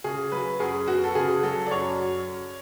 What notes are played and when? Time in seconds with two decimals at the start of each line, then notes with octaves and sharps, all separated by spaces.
0.04 C#3 G#4
0.32 F#3 B4
0.60 F#2 G#4
0.88 B3 F#4
1.04 A4
1.15 C#3 G#4
1.43 F#3 A4
1.67 D5
1.71 F#2 C#5